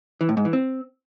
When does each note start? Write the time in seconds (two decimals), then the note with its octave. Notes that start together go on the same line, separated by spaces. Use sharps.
0.21 E3
0.29 A2
0.37 G#2
0.45 E3
0.53 C4